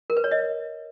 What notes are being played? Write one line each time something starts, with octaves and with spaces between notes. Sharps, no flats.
A#4
B4
C#5
D#5